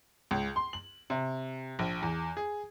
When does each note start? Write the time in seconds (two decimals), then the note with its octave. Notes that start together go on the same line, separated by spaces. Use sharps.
0.31 C#2
0.56 C6
0.73 F#7
1.10 C3
1.79 A#1
2.02 E2
2.37 G#4